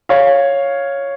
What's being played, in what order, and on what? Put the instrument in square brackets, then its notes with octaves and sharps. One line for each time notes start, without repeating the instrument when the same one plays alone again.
[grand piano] C#5 F5